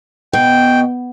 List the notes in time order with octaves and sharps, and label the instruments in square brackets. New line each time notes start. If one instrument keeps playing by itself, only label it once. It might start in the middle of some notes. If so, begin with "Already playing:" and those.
[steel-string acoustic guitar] B2 [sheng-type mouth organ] G5